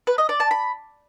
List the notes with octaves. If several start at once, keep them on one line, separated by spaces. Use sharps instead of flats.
B4
D#5
D5
A5
B5